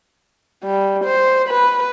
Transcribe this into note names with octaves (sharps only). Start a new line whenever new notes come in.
G3
C5
B4